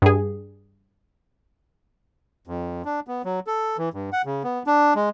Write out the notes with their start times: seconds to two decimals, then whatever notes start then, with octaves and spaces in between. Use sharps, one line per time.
0.02 G2 G#4
2.47 F2
2.85 D4
3.08 B3
3.25 F#3
3.47 A4
3.78 E3
3.94 G2
4.13 F#5
4.25 C#3
4.44 B3
4.67 D4
4.95 G#3